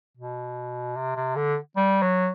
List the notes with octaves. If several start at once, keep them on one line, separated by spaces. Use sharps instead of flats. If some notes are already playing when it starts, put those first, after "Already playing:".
B2
C3
C3
D3
G3
F#3